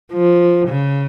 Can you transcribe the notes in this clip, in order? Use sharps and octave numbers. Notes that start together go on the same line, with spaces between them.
F3
C#3